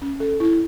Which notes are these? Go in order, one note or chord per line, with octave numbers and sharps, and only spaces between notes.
C#4
A4
E4